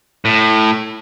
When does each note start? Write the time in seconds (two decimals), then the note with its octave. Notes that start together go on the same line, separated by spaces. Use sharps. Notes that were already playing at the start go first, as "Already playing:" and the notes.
0.25 A2